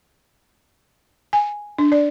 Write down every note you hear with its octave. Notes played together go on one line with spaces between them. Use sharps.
G#5
D4
D5